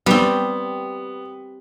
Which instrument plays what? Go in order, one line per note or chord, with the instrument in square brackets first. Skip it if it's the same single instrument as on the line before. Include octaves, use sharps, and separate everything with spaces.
[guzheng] G3 C4 [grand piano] B3